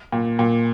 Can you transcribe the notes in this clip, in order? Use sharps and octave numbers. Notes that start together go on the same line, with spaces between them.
A#2
A#2